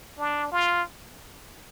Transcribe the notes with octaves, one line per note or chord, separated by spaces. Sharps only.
D4
F4